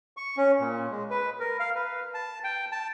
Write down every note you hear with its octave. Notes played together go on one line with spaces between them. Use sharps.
C#6
C#4
A#2
G#3
B4
A#4
F5
B4
A5
G5
A5